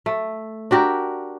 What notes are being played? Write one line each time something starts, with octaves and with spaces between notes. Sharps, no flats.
A3
D4 F#4 G4 A#4